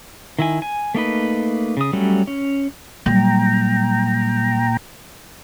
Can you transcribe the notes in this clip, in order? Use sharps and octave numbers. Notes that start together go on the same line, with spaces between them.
D#3 E4 G#5
G#5
A3 A#3 D#4 B4
C#3 D#6
F#3 G3 A3 C#4
C#4
A#2 F#3 G3 G5 A#5